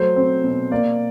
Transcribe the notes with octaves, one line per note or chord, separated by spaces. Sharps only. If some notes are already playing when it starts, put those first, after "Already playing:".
Already playing: F#3 A3 C5
C4
B2
A#3 D5